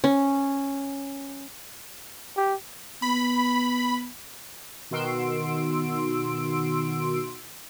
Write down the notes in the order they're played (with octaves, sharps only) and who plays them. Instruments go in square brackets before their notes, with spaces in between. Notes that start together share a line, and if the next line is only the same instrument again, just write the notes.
[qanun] C#4
[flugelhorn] G4
[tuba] B3 [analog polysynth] B5
[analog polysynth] B2 D#3 F#4 C6 E6 D7